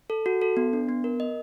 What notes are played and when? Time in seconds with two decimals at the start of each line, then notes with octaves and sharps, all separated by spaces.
0.10 A4
0.26 F#4
0.42 A4
0.57 B3
0.73 D4
0.89 B3
1.04 A#4
1.20 D#5